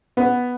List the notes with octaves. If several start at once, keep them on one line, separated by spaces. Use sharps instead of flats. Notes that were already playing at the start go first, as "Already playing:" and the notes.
B3